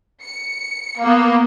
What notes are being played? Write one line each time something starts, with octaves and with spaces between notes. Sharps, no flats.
C#7
A#3 B3